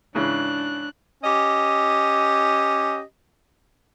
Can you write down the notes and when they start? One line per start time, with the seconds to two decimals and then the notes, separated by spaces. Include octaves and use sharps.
0.15 G#2 C#3 E3 D4 F#6
1.24 C#4 G4 D#5